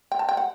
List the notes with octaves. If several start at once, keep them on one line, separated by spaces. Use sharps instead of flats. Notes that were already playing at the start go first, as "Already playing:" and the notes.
G5
A5
G5
F#5